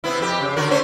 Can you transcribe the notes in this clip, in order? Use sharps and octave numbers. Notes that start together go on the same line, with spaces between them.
C3 B3 E4
F2 G4
C#3
D3 F#4 A#4
A3 C#4 C5